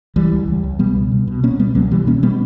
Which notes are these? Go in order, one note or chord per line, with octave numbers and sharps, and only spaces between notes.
C#2 E3 G3
C#2
C#2
C#2
B2 G3 B3
C#2
B2
B2
B2 A#3 C#4
C#2 G3 B3
C#2 F#3 A#3
B2 E3 G3
B2 A#3 C#4
B2 G3 B3